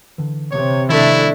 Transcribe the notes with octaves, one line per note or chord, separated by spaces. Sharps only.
D3 E3
C3 C#5
D#3 F3 A3 D4 E4